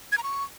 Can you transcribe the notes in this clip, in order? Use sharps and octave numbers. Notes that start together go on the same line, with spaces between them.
G#6
A#5
C#6